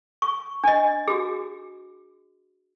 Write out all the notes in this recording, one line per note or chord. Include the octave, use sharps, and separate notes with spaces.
C#6
D4 D#5
F#4 G#4